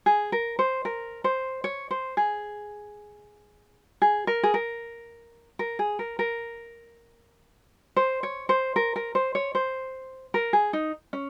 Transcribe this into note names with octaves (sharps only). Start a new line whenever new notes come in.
G#4
A#4
C5
A#4
C5
C#5
C5
G#4
G#4
A#4
G#4
A#4
A#4
G#4
A#4
A#4
C5
C#5
C5
A#4
A#4
C5
C#5
C5
A#4
G#4
D#4
C#4